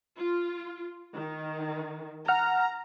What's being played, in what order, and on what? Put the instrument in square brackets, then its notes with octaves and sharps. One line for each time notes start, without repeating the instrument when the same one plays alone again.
[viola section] F4
D#3
[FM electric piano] F#5 F6 [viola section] A#5